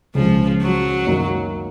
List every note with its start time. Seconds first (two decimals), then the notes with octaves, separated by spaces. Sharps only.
0.15 C#2 C#3 F3 G#3
0.61 F#3
1.07 F#2 D#3 A#3 D#4